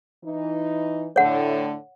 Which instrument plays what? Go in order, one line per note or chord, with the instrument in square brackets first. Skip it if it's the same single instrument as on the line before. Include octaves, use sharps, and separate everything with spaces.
[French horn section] E3 D#4
[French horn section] A2 D3 [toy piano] C#5 F#5